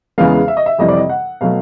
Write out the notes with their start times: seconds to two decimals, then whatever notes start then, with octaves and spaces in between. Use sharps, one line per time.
0.18 E2 C#3 E3 G#3 B3 F5
0.48 E5
0.57 D#5
0.66 E5
0.78 F2 C3 E3 G3 D#5
0.88 D5
0.97 D#5
1.09 F#5
1.41 B2 F#3 A3 F5